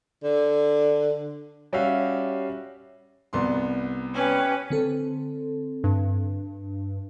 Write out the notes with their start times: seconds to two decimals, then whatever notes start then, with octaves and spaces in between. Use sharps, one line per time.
0.23 D3
1.73 G3 C#4 F#4 G4 E5 F5
3.33 C2 B3 C6
4.14 C#4 G4 B4
4.70 D3 C4 A4
5.84 G2